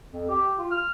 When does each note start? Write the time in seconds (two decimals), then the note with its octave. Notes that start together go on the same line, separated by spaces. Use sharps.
0.13 F2
0.29 G4
0.58 F4
0.71 F6